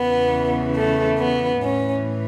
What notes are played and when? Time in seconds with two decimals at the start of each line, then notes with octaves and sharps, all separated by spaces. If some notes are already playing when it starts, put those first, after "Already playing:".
Already playing: E2 C#3 E3 B3
0.74 A3
1.18 B3
1.61 A2 E3 C#4